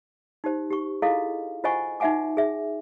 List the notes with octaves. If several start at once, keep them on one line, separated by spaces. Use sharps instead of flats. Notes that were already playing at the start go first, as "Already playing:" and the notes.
D#4 G4 C5
G4 C#6
E4 F4 G#4 A4 D#5 F5
F4 C5 D#5 F#5 G#5 C#6
D#4 F#4 E5 F#5 G#5 D6
G#4 E5